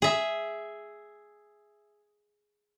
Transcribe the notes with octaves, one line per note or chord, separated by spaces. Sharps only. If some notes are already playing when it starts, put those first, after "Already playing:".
G#4 E5